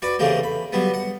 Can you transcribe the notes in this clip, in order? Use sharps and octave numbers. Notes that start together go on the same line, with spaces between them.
F#4 B4 D5
C#3 E3 A3 A#3 C4 G4
B5
F#3 G3 B3
F#5